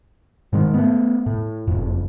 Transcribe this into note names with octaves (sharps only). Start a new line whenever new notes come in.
G#2 D#3 G#3
A3 B3
A2
F#1 F2